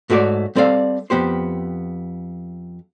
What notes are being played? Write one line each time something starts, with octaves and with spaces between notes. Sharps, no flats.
G#2 A3 F#4 C#5 D5
G3 C4 A4 D5 F5
F2 B3 G4 C5